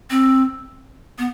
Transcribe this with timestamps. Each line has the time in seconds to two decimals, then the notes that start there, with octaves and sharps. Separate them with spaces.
0.10 C4
1.18 B3